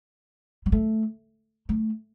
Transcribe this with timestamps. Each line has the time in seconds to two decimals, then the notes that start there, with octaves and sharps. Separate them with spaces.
0.66 G3
0.72 A3
1.69 A3